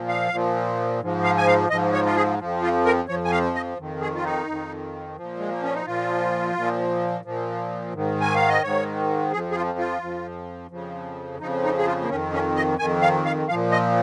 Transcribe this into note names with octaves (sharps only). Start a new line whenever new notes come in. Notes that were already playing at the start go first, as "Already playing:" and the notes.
Already playing: A#2 F3
F5
A#2 F3
G#2 F3
F5
G#5
F5
G#2 F3 D#5
C#5
F4
G#4
F2 F3
F4
A#4
F2 F3 C#5
G#5
F5
D#5
F2 D#3
G#4
F4
D#4
F2 D#3
A#2 F3
G#3
A#3
C#4
D#4
A#2 F3 F4
A#2 F3
A#2 F3
G#2 D#3
G#5
F5
D#5
G#2 D#3 C#5
F2 F3 G#4
G#4
F4
F4
F2 F3
F2 C#3 F3
F2 C#3 F3 D#4
D#4
G#4
F4
A#3
F2 D#3 C#4
C#4
D#5
F2 D#3 G#5
F5
F5
A#2 F3 F5
D#5